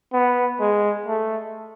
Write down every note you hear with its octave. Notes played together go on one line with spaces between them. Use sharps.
B3
G#3
A3